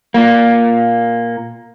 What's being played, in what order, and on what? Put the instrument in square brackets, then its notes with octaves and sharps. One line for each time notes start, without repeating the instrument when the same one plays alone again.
[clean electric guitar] A#2 A#3